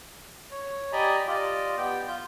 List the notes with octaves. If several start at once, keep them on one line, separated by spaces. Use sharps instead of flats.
C#5
G4 D5 D#5 G#5 A#5 B5
F4 G4 D5 D#5
B3 G4 G5
F4 G6